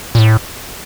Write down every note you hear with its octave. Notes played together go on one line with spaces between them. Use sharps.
A#2
A2